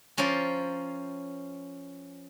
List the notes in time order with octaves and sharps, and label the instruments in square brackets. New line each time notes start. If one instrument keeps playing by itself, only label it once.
[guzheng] F3 C#4 A#4 C5 D5